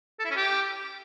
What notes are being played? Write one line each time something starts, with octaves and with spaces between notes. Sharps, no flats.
A4
E4
C#4
G4